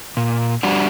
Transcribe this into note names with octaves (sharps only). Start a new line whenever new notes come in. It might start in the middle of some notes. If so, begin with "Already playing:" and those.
A#2
G3 D4 F#4